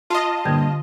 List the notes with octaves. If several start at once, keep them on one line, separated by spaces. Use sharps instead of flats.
F4 D#5 A5 C6
G2 A#2 D3 G3 G6 G#6